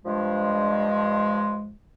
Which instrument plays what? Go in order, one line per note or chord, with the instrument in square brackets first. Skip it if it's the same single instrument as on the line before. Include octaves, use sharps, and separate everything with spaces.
[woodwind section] G2 F3 G#3